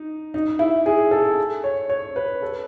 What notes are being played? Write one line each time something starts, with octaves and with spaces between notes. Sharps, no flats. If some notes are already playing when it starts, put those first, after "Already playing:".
Already playing: D#4
D#4
E4
G#4
A4
C#5
C#5
B4
A4